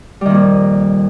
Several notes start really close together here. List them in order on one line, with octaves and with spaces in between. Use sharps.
G3 D#3 A#2 F2